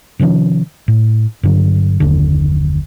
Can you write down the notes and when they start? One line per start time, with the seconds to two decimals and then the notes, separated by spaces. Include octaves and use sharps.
0.19 C3 D#3 F3 C#4
0.88 A2
1.43 G2 D3 F#3
2.00 F#1 D#2 D3